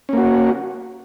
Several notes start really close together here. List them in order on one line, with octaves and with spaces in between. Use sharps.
C#4 A#3 F#4